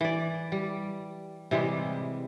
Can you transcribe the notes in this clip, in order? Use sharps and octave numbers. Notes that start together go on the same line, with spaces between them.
E3 D5
G3
C3 E3 G3 G#3